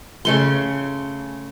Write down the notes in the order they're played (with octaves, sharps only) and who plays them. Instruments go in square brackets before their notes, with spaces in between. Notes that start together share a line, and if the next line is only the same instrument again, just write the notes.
[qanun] C#3 A3 C6